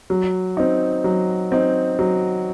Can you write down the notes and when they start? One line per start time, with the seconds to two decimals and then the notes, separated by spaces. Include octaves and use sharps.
0.10 F#3
0.57 C4 D#4
1.04 F#3
1.52 C4 D#4
1.99 F#3